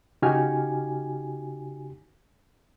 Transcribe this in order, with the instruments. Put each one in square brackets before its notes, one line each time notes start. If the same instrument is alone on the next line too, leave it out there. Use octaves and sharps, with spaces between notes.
[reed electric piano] C#3 D#4 F#4 G4 G#5 F6